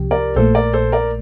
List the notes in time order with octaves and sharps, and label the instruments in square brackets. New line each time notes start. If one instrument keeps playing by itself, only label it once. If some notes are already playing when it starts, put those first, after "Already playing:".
Already playing: [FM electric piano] C2 C3 F3 G4
[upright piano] A#4 D5
[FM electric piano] A#1 A#2 A3 [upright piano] A4 C5
[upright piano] A#4 D5
A4 C5
A#4 D5